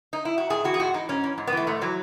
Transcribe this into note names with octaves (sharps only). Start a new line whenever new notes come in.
D#4
E4
F#4
G#2 G#4
E3 F#4
G#4
G#2 F#4
E3 D#4
G#2 C#4
E3
G#2
B3
E3 A3
G#2 A3
E3 F#3